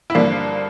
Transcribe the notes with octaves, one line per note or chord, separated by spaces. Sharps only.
E4
G2 D3 F3 A#3 D4